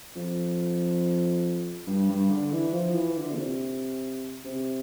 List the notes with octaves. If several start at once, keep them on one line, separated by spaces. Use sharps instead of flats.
F2
G2
G2
D3
E3
F3
E3
D3
A#2
C3
C3